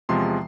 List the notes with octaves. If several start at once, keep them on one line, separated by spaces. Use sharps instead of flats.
E2 C3 F3 G#3 C6